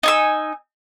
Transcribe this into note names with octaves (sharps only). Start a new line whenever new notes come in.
D#4 G#5 E6